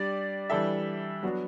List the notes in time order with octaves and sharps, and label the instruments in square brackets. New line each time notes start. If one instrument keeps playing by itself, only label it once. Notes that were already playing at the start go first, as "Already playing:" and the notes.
Already playing: [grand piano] G3 D4 G4 D5
E3 G3 D4 A4 E5
F#3 B3 D4 F#4